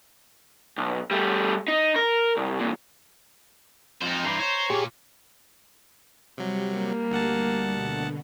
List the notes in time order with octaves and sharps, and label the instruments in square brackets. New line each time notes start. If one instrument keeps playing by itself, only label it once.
[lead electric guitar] B1
G3 A3
D#4
A#4
C2
E2 A#2
[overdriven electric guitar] F2 [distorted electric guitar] D#4 C5
[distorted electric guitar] G2 [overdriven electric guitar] E3 [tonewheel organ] A#5 C6
[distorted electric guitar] C5 [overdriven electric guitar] C#5
[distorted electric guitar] A#2 A#3 [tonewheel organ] G4 G#4
[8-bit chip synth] C3 F#3 [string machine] G3
[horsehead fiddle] A#3
[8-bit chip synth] D2 F#5 A5
[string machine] B2 D3